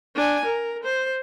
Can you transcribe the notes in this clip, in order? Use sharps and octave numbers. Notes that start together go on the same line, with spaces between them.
D4 G#5
A#4
C5